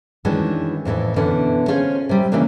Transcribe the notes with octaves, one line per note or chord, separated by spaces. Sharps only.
D#3 E3 G#3 C#4 D4 F#4
F2 A2 D#3 E3
B2 D3 E3 C#4
C#4 F4 G#4 C5
C3 G3
C#3 E3 G#3 A#3 D4